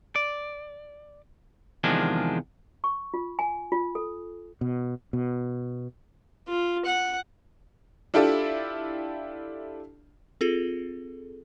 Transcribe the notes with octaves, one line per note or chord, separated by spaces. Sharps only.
D5
E2 C3 D#3 F3 G#3 D4
C#6
F4
G#5
F4
A4
B2
B2
F4
F#5
D4 E4 F4 G4 A4 D5
C4 F4 G#4 A4